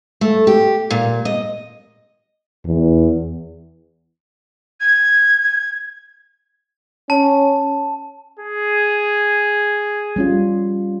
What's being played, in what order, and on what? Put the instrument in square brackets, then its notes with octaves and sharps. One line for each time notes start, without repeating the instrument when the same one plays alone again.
[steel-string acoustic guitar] A3
G4
A#2
D#5
[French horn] E2
[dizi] G#6
[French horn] C#4 [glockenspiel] A5
[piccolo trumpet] G#4
[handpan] G3 C#4 F4